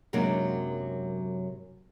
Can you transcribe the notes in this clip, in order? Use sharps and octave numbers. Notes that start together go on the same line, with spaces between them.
F#2 C3 F#3 G#3 A#3 D4